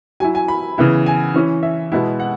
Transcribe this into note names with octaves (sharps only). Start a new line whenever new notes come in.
F#3 E4 G#5
G#5
B5
C#3 E3 B3 E4
G#5
E3 C#4 E4
E5
B2 G#3 B3 E4
F#5